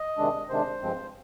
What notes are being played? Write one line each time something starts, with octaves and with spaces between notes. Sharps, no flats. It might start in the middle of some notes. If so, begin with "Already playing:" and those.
Already playing: D#5
C3 D#3 G#3 D4
C3 D#3 G#3 D4 C5
G2 F3 G#3 C4